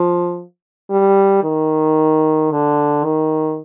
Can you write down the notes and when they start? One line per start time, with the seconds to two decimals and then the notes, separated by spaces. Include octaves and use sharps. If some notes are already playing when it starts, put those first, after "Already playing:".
Already playing: F3
0.90 G3
1.43 D#3
2.51 D3
3.04 D#3